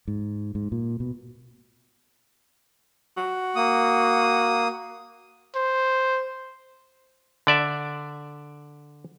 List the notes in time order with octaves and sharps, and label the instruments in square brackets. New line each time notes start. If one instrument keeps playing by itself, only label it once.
[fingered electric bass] G#2
G#2
A#2
B2
[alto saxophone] F#4
[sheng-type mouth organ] A#3 D#6
[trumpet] C5
[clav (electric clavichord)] D3 D5 E5